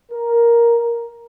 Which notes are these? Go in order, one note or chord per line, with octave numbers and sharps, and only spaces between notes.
A#4